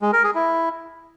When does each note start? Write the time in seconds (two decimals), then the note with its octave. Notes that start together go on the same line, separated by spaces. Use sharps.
0.02 G#3
0.13 A#4
0.24 G#4
0.35 E4